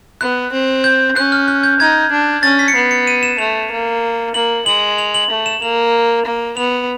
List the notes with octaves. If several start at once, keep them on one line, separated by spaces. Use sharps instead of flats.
B3 F#6
C4
G6
C#4 F#6
F6
F#6
G6
D#4 G#6
D4
C#4 A6
B6
C#7
B3 C7
C#7
D#7
E7
A3 F7
A#3
A#3 F#7
G#3 F#7
F7
F#7
A3
E7
A#3 F7
A#3
B3 F7